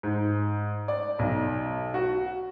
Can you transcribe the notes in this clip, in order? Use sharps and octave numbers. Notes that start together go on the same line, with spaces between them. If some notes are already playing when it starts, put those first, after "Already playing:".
G#2
D5
B1
F#4